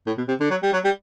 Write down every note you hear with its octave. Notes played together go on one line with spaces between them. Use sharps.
A2
B2
C3
D3
F#3
G3
F#3
G3